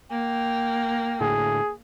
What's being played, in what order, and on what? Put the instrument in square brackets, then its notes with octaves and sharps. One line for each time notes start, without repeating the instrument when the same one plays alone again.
[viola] A#3 [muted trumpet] G5
[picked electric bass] A2 D3 [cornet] G#4